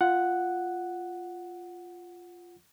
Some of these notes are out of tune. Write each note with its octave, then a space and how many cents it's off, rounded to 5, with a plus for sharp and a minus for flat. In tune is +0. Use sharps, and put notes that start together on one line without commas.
F4 +0 F#5 +0